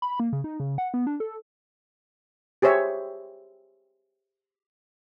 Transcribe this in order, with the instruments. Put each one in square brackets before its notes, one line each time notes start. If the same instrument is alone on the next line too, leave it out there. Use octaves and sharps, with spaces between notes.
[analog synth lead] B5
A#3
C#3
D#4
C#3
F#5
B3
D4
A4
[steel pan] G4 G#4 C5 C#5 E5